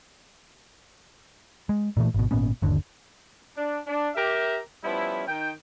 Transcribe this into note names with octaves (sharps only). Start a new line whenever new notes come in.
G#3
A#2 E3 A3
G#1 B2
G#1 A#2 B3 C#4
G1 D#2 D3
D4
D4
G4 A#4 E5
F3 G3 B3 C#4 E4
D#3 G5